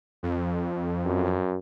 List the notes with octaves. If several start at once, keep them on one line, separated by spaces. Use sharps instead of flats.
F2
F#2